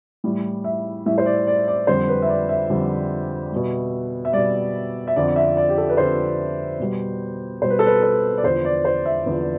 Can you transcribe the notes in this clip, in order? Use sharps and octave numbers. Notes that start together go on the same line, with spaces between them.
A2 E3 G3
E5
A2 E3 G3 E5
C5
D5
D5
D5
F2 D3 G3 C5
B4
E5
D5
E5
F2 D3 G3
B2 G3
E5
B2 G3 D5
E5
F2 D3 F3 D5
E5
D5
G4
A4
B4
F2 D3 F3 C5
B2 G3
B2 G3 C5
B4
A4
B4
A4
D5
E2 D3 F3 C5
D5
C5
E5
E2 D3 F3